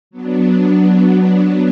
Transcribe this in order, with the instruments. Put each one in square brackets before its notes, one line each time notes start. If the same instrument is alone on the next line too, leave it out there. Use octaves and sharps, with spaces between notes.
[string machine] F#3 B3 D4